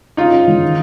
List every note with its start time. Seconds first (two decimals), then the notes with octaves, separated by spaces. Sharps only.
0.17 C#3 D#4 F4
0.32 C#3
0.48 E3
0.62 D#3